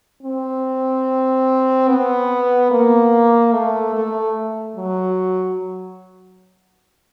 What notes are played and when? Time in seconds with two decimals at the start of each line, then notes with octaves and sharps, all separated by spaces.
0.23 C4
1.88 B3
2.71 A#3
3.53 A3
3.95 A3
4.76 F#3